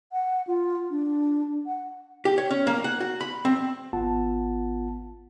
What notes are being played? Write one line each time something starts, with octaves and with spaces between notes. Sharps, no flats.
F#5
F4
D4
F#5
G4
C#5
C#4
A#3
F#5
F#4
B5
C4
G#1 B3 F4 F#5 A5